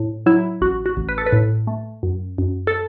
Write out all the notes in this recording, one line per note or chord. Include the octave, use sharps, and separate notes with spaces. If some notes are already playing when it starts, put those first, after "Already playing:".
Already playing: A2
F#3 E4
A1 F#4
F#4
A1
B4
A4
B4
A2
A3
F#2
F#2
A4